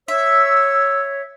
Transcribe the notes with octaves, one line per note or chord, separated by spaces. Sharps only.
C#5 E5 E6